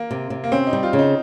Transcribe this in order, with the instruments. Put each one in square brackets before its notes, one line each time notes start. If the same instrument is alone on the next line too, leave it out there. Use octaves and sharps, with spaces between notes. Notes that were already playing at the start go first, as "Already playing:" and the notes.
Already playing: [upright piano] A#3
[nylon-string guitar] C3
C3
[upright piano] A#3
[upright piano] C4 [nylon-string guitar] C#4
[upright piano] D#4
[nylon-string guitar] G3
[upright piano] F4
[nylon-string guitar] C#3
[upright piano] D#4